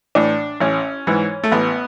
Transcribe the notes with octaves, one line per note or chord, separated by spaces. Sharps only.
A2 E3 D4
A1 C#4
G#2 E3
A3
A1 B3